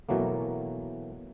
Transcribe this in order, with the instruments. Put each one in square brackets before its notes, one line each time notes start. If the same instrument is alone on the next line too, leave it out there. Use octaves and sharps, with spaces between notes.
[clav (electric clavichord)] B2 E3 F#3 A3 A#3